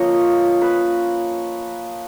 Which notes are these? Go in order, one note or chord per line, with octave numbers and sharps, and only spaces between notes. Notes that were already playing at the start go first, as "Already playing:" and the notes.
Already playing: F3 A#3 C#4 C#5 D#5
B4